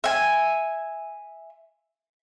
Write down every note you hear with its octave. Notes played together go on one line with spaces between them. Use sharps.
E5 G#5